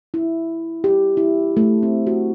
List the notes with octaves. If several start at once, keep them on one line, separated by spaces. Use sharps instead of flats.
E4
G4
E4
A3
C4
F#4